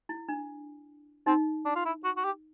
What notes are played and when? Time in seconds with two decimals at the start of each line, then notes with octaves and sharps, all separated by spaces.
0.09 E4
0.29 D4
1.26 C4 D#4
1.65 D4
1.75 F4
1.85 E4
2.04 F#4
2.17 F#4
2.25 G4